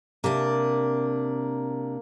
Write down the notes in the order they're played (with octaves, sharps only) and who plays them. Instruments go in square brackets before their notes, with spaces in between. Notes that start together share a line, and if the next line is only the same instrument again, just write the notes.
[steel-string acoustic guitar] C3 D4 [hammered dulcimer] A#3